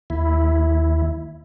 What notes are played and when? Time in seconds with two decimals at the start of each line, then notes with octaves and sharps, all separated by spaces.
0.10 D#2 E4